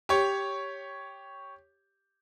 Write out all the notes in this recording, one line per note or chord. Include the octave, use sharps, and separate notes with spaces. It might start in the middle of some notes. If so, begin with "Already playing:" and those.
G4 C#5